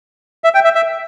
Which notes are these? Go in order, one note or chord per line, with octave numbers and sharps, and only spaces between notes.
E5
G5
E5
E5